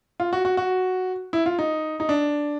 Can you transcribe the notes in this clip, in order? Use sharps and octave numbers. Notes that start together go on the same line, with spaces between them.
F4
F#4
F#4
F#4
E4
F4
D#4
D#4
D4